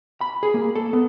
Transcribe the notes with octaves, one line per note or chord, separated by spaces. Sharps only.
B5
G#4
A#3
A4
B3